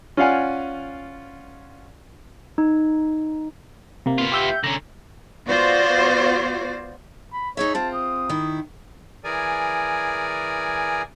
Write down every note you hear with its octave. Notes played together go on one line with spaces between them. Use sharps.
C#4 F4 D5 F5 F#5 G#5
D#4
C3 A#3
B3 F4
G4 E5 G6
D3 C#4 A#5
B3 F4 F#4 C5 D5
B5
D#4 G#4 C#5 E5
C4 F4 A5
D#6
D#3 E4
E3 G#4 A#4 D5 G#5